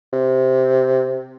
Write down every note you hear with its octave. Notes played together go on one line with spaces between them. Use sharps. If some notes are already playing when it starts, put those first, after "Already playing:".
C3